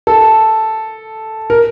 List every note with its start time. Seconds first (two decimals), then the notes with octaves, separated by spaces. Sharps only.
0.07 A4
1.50 A#4